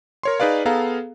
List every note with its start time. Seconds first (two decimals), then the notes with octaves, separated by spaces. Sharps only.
0.23 A#4 C#5 C6
0.40 D#4 G#4 B4 D5 F5
0.65 B3 G#4 A4 F5 A#5